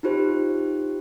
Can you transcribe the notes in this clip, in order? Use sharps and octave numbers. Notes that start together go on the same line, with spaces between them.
D#4 F4 G4 C5